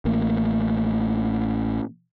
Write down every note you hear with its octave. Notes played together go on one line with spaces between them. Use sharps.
A1 A3 A#3